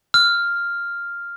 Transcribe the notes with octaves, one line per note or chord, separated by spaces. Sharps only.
F6